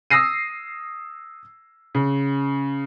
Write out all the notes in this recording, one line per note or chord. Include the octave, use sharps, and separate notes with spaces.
D#6 E6 A#6 C7 D#7
C#3